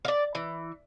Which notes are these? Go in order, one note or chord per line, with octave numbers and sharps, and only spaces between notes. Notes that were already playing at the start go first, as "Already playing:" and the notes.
D5 F5
E3